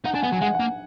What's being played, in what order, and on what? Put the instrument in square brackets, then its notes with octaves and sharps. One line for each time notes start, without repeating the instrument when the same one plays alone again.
[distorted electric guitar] D#4 [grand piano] F#5
[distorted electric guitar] D4 [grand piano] G#5
[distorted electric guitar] B3 [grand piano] F#5
[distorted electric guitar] F#3 [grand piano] G#5
[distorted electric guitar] G#3 [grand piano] F#5
[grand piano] F#5
[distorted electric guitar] A#3